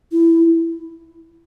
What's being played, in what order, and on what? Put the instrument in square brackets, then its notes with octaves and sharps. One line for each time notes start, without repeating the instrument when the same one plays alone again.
[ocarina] E4